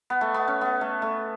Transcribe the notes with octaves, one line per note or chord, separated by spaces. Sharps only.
B3
A3
B3
C#4
B3
A3
A3